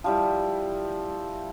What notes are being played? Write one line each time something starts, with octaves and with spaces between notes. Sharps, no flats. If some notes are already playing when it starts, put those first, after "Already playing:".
F3 G3 E4